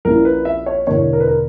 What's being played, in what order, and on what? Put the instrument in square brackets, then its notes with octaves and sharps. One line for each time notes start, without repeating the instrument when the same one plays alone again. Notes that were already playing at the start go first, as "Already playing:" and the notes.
[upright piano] A#1 A#2 A#3 C#4 E4 [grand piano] A#4
[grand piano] B4
E5
C#5
[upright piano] E1 E2 D3 A#3 [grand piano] C#5
[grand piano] A#4
B4
A#4